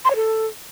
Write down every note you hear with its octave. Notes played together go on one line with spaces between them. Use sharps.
C6
C#5
A4